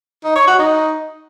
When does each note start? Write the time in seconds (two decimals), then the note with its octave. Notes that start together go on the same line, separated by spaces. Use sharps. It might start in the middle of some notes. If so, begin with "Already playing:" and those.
0.24 D#4
0.36 C#5
0.47 F#4
0.59 D#4